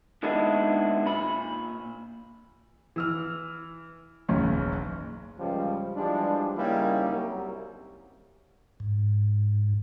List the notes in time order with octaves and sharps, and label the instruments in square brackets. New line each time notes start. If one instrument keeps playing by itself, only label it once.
[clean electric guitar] A#2 D#3 G#3 B3 D4 E4
A#2 B5
[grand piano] E3 E6 F6
F#1 B1 E2 C#4
[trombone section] C#2 F3 G3
E3 F3 G3 G#3 D4
C#3 G3 A#3 C#4 D#4 E4
C2 F#3
[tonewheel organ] G#2